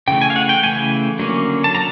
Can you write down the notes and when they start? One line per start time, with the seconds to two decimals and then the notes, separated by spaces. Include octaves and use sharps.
0.08 C#3 E3 A3 G5
0.21 G#5
0.30 F5
0.36 F#5
0.49 G5
0.63 C#3 E3 A3 G#5
1.19 D3 F#3 A#3 C#4
1.64 A5
1.75 D3 F#3 A#5